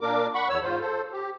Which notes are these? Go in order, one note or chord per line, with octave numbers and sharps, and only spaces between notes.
A#2 A#3 D4 A#4 D6
F#5 B5 C#6
E2 C#5 E6
G#2 F4 C5
A4 C5
G4